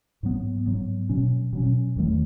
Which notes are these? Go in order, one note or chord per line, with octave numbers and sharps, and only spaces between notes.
G#2 F#3 B3
G#2 F#3 B3
B2 F#3 C#4
B2 F#3 C#4
E2 D#3 F#3 A3